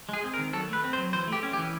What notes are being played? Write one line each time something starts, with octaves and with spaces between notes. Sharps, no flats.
G#3 G#4
C4
A#4
D#3
F#3 A4
A3 B4
C4
C5
F#3
E3 C5
A3 G4
C#4
G4
E3